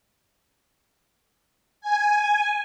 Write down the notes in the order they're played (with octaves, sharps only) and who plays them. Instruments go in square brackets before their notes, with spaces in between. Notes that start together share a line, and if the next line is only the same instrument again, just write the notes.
[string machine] G#5